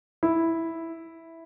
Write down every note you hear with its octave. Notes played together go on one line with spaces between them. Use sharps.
E4